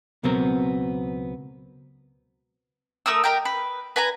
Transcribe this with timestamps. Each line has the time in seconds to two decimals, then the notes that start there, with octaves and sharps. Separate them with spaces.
0.23 C#2 B2 F#3 B3 C4 A#4
3.06 A3 A#4 D#6 E6
3.24 G4 A#4 D#5 G5
3.45 B4
3.96 B4 G#5 A#5